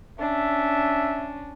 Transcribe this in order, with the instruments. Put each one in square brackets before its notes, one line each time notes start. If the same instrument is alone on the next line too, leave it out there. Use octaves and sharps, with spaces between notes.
[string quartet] C#4 D4 [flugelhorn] E5